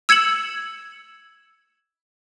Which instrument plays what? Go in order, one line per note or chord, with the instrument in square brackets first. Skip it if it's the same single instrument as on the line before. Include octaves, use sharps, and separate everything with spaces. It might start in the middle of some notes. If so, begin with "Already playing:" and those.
[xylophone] E6 G#6 C#7 E7 F#7